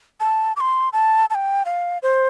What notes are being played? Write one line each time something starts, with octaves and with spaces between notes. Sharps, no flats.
A5
D6
C6
A5
A5
G5
F5
C5